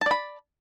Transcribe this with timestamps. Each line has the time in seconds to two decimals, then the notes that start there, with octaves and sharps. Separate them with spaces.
0.01 A5
0.06 D5
0.11 B5